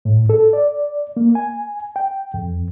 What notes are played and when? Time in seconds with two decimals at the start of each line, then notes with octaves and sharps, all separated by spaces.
0.05 A2
0.29 A4
0.53 D5
1.17 A#3
1.35 G#5
1.96 G5
2.34 F2